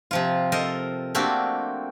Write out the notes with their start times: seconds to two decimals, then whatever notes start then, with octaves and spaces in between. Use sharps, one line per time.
0.11 C3 F3 F4
0.52 A4 A#4 C5 D#5
1.15 A3 A#3 C4 D4 F#4 G4